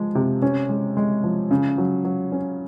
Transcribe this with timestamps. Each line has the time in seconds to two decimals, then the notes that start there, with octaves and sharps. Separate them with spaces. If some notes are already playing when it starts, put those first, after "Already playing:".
Already playing: F3 G#3
0.15 C3
0.42 C#4
0.69 G#3
0.97 G#3
1.24 F3
1.51 C#3
1.78 F#3
2.05 F#3
2.32 C#4